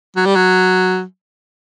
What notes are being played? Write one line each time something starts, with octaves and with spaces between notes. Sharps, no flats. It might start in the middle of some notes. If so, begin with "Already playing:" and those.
F#3
G3
F#3